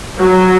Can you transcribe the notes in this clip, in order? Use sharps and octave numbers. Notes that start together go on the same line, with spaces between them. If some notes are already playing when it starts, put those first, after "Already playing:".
F#3